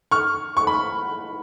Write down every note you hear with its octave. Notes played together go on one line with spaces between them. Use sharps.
C#6 F6
C#6
B5